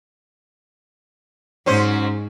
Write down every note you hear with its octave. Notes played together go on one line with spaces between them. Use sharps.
G#2 F#3 C#4 C5